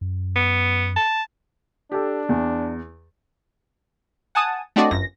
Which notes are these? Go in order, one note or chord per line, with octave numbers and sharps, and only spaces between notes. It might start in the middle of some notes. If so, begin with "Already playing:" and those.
F#2
B3
A5
D4 G4 A4
E2
F#5 G#5 A5 D#6
A3 C4 D4 F#4 D5 D#5
G1 F#2 A#6